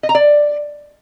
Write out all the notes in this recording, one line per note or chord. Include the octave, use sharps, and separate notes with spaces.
D#5
A#5
D5